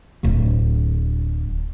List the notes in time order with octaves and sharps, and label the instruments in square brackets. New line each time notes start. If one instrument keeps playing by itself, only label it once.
[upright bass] D1 D3